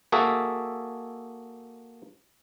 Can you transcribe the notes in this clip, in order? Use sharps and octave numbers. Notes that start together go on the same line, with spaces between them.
A#3 F#4 G#4 A4 E5